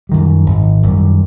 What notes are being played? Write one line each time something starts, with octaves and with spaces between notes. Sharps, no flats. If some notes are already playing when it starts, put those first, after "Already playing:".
F#2 D#3 G3
G#1
F#2 D#3 G3